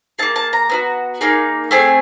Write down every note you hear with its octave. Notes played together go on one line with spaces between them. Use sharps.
A#3 D#4 G#4 A5
A5
A#5
B3 D4 F#4
A#3 D#4 G#4
A3 C4 G#4 G#5